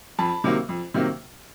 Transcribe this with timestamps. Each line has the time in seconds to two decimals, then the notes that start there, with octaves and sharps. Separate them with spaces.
0.19 F2 A5 B5
0.44 C3 D#3 F#3 A#3
0.69 F2
0.94 C3 D#3 F#3 A#3